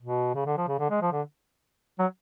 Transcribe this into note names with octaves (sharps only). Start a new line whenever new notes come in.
B2
C#3
D3
F3
C#3
D3
G#3
F3
D3
F#3